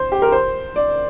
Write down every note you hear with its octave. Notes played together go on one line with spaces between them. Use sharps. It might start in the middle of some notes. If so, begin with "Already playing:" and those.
Already playing: C5
G4
A#4
C5
D5